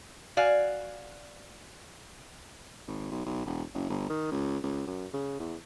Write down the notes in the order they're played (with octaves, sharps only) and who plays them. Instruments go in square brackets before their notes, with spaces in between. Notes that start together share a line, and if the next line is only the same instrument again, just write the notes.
[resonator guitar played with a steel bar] F#4 D5 F5 G#5
[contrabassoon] G#1
B1
B1
E1
F#1
G1
D#3
C#2
C#2
F#2
C#3
E2